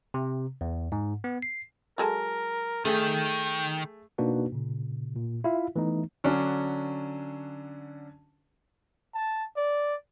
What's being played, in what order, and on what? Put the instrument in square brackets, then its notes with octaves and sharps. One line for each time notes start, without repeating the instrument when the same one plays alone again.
[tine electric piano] C3
E2
G#2
B3
C7
[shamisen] F#3 G#3 A4 [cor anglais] A#4
[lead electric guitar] D#3 [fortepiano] A3 G#4 [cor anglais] G5
[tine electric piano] B2 A#3 D4 D#4 F#4 B4
A#2 C#3
A#2
E4 F4 E5 F5
E3 A3 B3 D#4
[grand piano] D3 F#3 C#4 D4
[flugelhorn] A5
D5